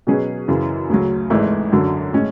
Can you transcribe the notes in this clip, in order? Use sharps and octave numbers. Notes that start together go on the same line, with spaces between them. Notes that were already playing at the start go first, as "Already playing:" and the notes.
B2 F#3 C#4 G#4 B4
F#2 C#3 E3
D2 C#3 F#3
G#1 G#2 E3 A3 E4
F#2 D3 F#3
A2 G#3 C#4